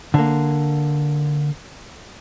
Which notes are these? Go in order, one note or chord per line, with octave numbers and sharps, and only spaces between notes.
D3 A#3